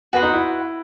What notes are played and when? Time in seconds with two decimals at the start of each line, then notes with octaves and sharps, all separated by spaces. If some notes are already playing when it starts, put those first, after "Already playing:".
0.13 B3 F#4 B4 F#5 C6
0.23 D#4
0.33 E4